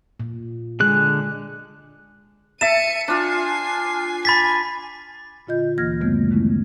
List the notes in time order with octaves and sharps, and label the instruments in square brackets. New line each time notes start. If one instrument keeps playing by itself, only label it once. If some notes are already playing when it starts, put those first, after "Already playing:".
[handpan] A#2
[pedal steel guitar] D3 F#6 [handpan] G#3 G#4
[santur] E5 A5 [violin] C#7 D#7 [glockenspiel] E7
[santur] D4 F4 [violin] G#5 C7
[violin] G#5 G#6 [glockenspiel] B5 A6 B6
[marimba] A#2 D3 F4 D#5 G6
D2 E3 A#3 F6 G#6 A#6
F#2 C#3 G3 A3 B3
D#3 G#3 A3 C#4 E4